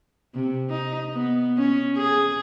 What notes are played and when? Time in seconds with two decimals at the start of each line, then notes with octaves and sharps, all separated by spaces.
0.35 C3
0.70 D#4
1.14 B3
1.57 C#4
1.97 G#4